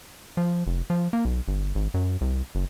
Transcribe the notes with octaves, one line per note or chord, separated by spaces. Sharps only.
F3
F1
F3
A#3
B1
G1
G#1
F#2
C2
F#1